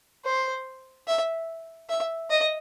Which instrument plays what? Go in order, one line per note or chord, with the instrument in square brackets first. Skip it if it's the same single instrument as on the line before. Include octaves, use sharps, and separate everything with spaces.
[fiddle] C5
E5
E5
D#5